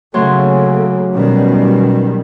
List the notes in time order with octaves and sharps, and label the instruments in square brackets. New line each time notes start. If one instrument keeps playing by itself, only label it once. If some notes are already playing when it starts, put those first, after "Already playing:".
[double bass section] C#3 A#3 [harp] F#3 A3 C6 [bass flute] A4
[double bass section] B2 D#3 G3 [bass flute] C#4